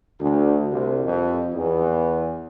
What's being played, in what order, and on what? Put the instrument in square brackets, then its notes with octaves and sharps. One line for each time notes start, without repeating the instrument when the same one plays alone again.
[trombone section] D2
C2
F2
E2